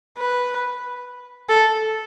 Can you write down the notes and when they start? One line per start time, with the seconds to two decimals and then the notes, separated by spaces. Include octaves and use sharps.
0.18 B4
1.49 A4